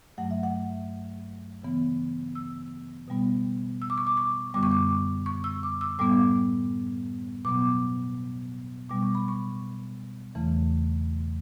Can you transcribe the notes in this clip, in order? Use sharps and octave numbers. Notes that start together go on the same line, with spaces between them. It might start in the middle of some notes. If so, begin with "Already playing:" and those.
G2 F#3 A3 F#5
E5
F#5
C#3 E3 B3
E6
B2 G3 B3
E6
D6
C#6
D6
C#6
F#2 D3 G3 B3 D6
C#6
D6
C#6
E6
D6
E6
A2 G3 B3 D6
B2 F#3 B3 D6
B2 G3 B3 D6
C#6
B5
C#6
E2 C#3 E3 A3